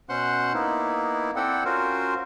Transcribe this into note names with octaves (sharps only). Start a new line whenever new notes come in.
B2 C#4 C5 F#5 C6 F#6
A#3 B3 D#4 E4
C4 E4 A4 D5 F#5 G5
C#4 F4 F#4 A#4 C5